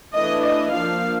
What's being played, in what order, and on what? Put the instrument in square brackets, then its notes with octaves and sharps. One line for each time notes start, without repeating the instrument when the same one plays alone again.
[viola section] E3 A3 D4 D#5
D#5
F3 A#3 D4 F5